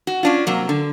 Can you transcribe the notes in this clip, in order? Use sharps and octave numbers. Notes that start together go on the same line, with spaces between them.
F#4
C#4 D4 F4
C3 F#3 A#3
D3